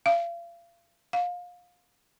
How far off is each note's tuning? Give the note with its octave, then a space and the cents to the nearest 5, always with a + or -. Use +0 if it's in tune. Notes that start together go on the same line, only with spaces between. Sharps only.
F5 -35
F5 +25